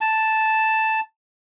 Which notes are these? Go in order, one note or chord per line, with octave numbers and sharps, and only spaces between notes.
A5